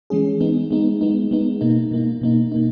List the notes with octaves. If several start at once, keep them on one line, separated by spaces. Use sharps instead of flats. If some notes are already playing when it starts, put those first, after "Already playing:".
E3 G#3 C#4 G#4
G#3 B3 D#4
G#3 B3 D#4
G#3 B3 D#4
G#3 B3 D#4
B2 A#3 D#4
B2 A#3 D#4
B2 A#3 D#4
B2 A#3 D#4